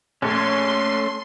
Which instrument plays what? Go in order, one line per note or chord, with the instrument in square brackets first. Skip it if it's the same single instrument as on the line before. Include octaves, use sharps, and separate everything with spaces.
[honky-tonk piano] A#1 [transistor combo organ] A3 [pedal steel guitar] C#4 A4 C#5 [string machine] C6